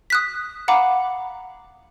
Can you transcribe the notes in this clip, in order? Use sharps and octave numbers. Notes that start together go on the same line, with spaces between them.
D#6 F#6 B6
F5 F#5 A#5 B5 D6